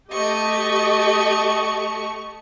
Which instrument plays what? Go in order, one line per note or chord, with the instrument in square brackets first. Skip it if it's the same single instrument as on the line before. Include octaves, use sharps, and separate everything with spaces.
[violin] A3 C#6 [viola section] G4 D#5